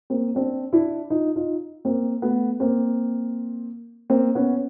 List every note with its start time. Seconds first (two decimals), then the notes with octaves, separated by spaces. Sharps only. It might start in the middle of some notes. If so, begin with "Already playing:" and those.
0.10 A#3 C4
0.35 C4 D4
0.73 D4 E4
1.10 D#4 F4
1.36 D#4 F4
1.85 A#3 C4
2.22 A3 B3
2.60 A#3 C4
4.10 A#3 C4
4.35 B3 C#4